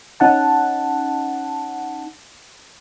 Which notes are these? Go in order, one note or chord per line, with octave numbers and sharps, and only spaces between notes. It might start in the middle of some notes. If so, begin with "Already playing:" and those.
C#4 D#4 F#5 A5